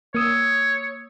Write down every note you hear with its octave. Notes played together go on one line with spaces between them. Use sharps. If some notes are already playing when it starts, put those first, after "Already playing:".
A#3 C#5 D#6 E6